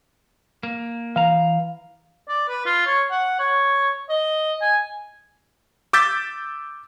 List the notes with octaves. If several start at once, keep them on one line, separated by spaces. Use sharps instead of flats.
A#3
E3 F5 A#5
D5
B4
F4
C#5
F#5
C#5
D#5
G#5
D6 E6 G6 A6 B6